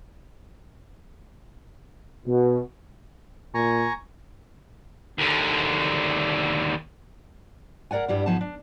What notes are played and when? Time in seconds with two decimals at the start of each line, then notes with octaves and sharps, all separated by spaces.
2.26 B2
3.54 A#2 G#5 A#5 C#6
5.18 D#2 D3
7.91 G#4 A#4 D5 F#5 G#5
8.08 G2 G3 E4
8.26 G#2 F3 B3 D#4 G#4 A5
8.41 D4